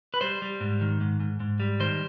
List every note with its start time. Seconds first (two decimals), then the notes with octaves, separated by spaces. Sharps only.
0.14 B4
0.21 G3 C5
0.42 G3
0.61 G#2
0.81 D#3
1.01 G#2
1.20 G#2
1.40 G#2
1.60 G3
1.80 D#3 C5